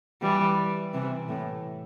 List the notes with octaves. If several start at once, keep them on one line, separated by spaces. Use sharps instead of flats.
E3 G3
C3 E3
A2